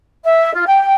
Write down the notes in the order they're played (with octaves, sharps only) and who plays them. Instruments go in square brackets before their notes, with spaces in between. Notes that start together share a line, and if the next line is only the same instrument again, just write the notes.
[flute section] E5
F4
G5